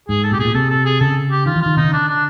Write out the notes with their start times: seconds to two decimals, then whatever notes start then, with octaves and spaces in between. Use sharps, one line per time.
0.08 G#2 G#4
0.24 A4
0.31 A#2 G4
0.39 B2 G#4
0.45 A#2
0.55 C3 A4
0.70 A4
0.85 G#4
1.00 C#3 A4
1.31 G4
1.46 D#3 F4
1.56 E3
1.62 D#3 F4
1.77 C3 D#4
1.84 C#3
1.93 D3 D4
2.08 D4